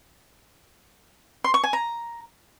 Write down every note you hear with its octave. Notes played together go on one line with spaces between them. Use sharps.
C6
C#6
G#5
A#5